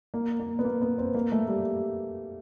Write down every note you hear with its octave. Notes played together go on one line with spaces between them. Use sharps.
A#3
A#3
B3
A#3
B3
C4
A#3
A3
G3